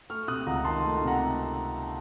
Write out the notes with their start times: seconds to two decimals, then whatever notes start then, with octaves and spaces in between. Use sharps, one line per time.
0.10 A3 C#6 F6
0.28 C3 D#6 F#6
0.47 C#2 F#5 A#5
0.65 D#3 A5 C6
0.83 A3
1.02 C3
1.08 F#5 A#5